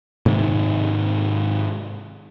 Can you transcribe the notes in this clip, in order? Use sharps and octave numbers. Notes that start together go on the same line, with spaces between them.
G#2 C3 D#3